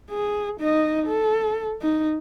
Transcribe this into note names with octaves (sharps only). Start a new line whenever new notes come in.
G#4
D#4 D#5
A4
D#4